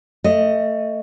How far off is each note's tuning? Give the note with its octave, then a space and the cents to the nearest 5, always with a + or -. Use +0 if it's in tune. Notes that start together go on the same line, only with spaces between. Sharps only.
A3 +25 D#5 +0